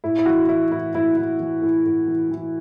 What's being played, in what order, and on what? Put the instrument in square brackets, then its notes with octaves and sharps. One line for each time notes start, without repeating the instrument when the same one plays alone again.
[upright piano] A2 E4
E4
E3 F#4
E3 E4
A2 E4
A2 E4
E3 E4
E3
A2
A2
E3
E3